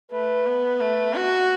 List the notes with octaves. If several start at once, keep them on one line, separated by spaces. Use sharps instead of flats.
A3 B4
B3
A3
F#4